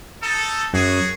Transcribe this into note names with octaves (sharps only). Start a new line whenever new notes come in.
D#4 A4
F#2 F#4 G#4